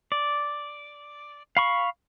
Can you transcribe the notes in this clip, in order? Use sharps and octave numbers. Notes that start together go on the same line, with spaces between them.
D5
F5 B5 C#6